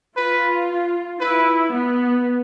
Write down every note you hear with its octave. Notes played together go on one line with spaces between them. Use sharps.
F4 B4
E4 B4
B3